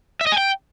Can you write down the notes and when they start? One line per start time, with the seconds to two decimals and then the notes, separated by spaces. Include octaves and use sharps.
0.21 E5
0.27 D#5
0.32 G#5
0.38 G5